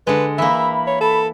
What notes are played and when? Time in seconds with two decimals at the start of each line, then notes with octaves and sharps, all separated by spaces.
0.07 D3 G#3 B4
0.38 E3 A#3 E5 B5
0.87 C#5
1.01 A4